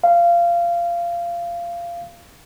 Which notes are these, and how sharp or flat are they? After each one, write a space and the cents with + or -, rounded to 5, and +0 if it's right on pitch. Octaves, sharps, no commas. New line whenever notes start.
F5 -20